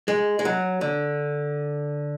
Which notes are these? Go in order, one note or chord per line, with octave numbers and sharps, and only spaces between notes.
G#3
G#3
F#3
D3